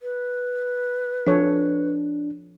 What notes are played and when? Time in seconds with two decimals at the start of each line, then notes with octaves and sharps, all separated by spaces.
0.01 B4
1.27 F3 D4 A4 C#5